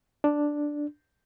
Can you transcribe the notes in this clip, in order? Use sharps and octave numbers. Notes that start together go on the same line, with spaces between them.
D4